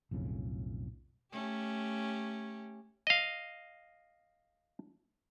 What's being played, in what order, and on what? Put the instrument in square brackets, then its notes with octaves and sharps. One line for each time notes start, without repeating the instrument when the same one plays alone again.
[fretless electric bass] B1 F2 A2 C#3
[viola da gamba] A3 C#4 G4
[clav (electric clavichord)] D#5 F5